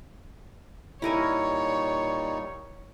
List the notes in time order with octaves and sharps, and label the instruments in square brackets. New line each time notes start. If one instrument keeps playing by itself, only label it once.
[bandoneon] A#2 G3 D#4 [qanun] E4 A#4 G#5 [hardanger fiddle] C#5